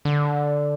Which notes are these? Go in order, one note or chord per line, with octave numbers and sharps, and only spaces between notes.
D3